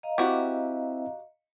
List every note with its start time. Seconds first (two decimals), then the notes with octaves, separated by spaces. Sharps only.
0.03 D#5 F5 A#5
0.18 C4 E4 F#4 G4 E5